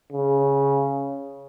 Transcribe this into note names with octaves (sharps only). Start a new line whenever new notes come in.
C#3